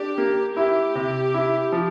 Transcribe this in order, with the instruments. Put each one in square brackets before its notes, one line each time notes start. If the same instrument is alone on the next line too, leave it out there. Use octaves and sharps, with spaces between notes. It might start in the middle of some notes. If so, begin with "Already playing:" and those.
Already playing: [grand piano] D4 [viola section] G4
[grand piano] A#3
[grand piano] E4 [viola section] G4
[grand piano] C3
E4
F3